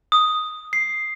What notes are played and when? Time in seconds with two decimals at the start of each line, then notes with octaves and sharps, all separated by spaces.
0.12 D#6
0.73 C7